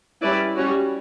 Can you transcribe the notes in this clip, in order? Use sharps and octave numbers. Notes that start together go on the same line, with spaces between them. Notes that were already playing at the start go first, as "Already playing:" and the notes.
G3 C#4 E4 B4 D5
G3 C#4 F#4 C#5